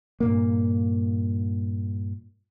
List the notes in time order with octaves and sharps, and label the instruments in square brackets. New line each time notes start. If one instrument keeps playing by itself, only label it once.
[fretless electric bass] G2 A#2 A#3